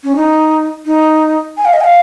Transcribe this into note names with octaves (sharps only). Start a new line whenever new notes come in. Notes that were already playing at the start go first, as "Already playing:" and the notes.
C#4
D#4
D#4
G#5
F5
D#5
G#5
F5